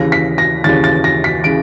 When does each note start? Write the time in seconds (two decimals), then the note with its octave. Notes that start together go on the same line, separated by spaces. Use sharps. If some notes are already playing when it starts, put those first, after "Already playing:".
Already playing: D#2 C#3 E3 A#6
0.12 B6
0.38 A#6
0.64 D#2 C#3 E3 A6
0.84 A6
1.04 A#6
1.24 B6
1.44 C#3 E3 D7